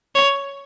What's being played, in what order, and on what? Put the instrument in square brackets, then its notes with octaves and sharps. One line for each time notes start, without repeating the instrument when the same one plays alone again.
[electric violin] C#5